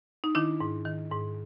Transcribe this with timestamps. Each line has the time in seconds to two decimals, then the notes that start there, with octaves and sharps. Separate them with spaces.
0.24 D#4
0.35 D#3 D4 E4
0.61 G#2
0.85 D#3
1.11 G#2